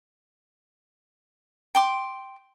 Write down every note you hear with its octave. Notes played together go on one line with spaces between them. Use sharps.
G5 C6 D6